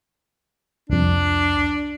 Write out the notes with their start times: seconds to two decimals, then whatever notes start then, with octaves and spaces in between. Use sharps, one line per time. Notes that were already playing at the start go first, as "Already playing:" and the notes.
0.90 C2 F2 D4